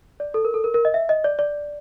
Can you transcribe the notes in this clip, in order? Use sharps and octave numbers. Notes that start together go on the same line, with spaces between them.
D5
A4
A#4
A4
A#4
A#4
D#5
E5
D#5
D5
D5